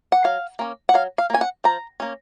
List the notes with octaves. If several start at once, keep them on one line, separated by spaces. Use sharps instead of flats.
F#5
F#3 F5
A#3 C#4
F#5
F#3 F5
F5
A#3 C#4 G#5
F#5
F3 A#5
A#3 C#4